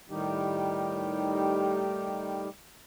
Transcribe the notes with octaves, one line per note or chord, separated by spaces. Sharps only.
A2 D#3 G3 D#4 G4